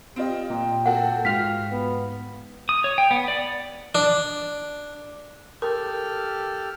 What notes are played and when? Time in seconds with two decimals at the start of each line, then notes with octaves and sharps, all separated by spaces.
0.16 C4 F4 G4 D#5
0.50 A#2 G5
0.86 A#3 F#4 A4 F#5
1.25 G#2 F4 F#4 F5 F6 B6
1.71 B3
2.69 D#6
2.84 C#5
2.98 G5
3.11 B3
3.28 D5
3.95 D4
5.62 G4 A4 A#4 F6